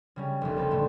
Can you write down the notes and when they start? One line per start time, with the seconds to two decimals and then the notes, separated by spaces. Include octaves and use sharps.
0.16 C#3 G3 C#4
0.41 F1 C2
0.57 B3 C4 G4 A4
0.71 A2 D3 A3